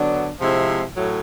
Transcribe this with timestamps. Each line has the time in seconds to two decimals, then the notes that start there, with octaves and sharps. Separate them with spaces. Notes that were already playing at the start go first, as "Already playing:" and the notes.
Already playing: D3 F#3 B3 D4
0.40 C3 F3 G#3 C4 E4
0.94 A2 F#3 A3